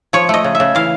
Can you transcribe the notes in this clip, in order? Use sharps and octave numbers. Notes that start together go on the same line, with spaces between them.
F3 C#5
A3 D#5
C#3
E5
C#3
E3 F5